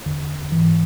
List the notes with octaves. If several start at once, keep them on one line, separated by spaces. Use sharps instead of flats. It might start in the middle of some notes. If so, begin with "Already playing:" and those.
E2 D3
G#2 E3